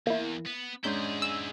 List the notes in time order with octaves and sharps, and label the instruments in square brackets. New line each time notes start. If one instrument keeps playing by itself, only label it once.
[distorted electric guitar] E2 [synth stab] A#3 E4
[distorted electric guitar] B3
[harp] G#2 C#4 D4 [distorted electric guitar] E4 G#4 [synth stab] G6
[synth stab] E6